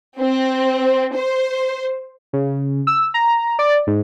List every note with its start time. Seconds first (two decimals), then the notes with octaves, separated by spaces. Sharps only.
0.20 C4
1.16 C5
2.33 C#3
2.87 E6
3.14 A#5
3.59 D5
3.87 G#2